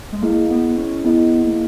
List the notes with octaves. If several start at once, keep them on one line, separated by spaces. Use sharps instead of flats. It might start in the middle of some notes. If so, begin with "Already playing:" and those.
G#3
A#3 E4 G#4 D#5
B3
C#4
B3 E4 G#4 D#5
A#3